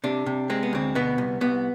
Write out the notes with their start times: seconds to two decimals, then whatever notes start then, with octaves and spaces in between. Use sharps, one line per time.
0.04 C3 D4
0.26 C3
0.50 G#3 C4
0.63 B3
0.73 D2 C4
0.95 B2 B3
1.18 C2
1.41 C2 B3